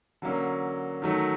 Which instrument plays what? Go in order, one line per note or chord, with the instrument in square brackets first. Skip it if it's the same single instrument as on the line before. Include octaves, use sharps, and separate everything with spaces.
[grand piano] D3 F#3 A#3 C#4
D#3 F#3 A3